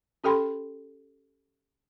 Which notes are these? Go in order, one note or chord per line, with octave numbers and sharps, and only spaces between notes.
C#4 G4 A4 G5 B5 C6